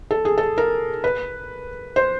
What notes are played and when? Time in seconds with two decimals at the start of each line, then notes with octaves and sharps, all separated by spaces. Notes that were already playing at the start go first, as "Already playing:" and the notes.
0.11 A4
0.25 G#4
0.38 A4
0.58 A#4
1.04 B4
1.96 C5